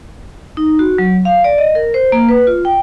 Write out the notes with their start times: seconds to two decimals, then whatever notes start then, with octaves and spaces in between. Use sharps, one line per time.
0.57 D#4
0.79 F#4
0.98 F#3
1.25 F5
1.44 D5
1.58 D#5
1.75 A#4
1.94 C5
2.12 A#3
2.29 B4
2.47 F4
2.65 G5